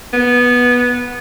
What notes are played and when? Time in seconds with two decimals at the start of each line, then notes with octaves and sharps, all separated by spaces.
0.13 B3